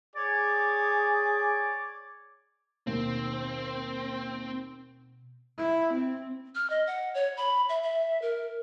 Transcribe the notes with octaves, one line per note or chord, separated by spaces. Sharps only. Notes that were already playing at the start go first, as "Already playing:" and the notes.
G#4 C#5 D5 D6
D#2 B2 C4
E4
C4
F6
D#5
F#5
C#5
B5
E5
E5
A#4